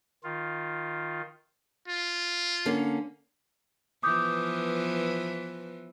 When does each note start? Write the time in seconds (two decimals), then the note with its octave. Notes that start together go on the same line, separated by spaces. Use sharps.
0.24 D#3 F4
1.88 F4
2.66 D3 A#3 C#4
4.03 E3 F3 B3 D6 D#6 G6